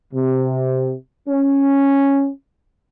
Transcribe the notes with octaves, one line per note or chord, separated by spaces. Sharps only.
C3
C#4